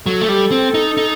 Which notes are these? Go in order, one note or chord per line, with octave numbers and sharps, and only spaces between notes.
F#3 A4
A3
G3
C4
D#4
D#4